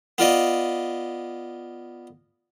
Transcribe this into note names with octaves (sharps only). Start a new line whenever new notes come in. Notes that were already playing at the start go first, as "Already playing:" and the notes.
B3 F4 D5 D#5